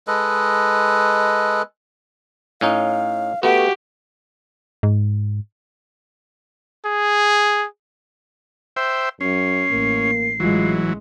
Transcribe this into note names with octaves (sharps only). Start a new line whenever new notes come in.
G#3 A4 B4 D#5
A2 C#4 D#4 F5
A3 B3 F#4 G4 A4
G#2
G#4
C5 E5 G5
F#2 C#4 C7
A1 A#3
A1 E3 F#3 G#3 F4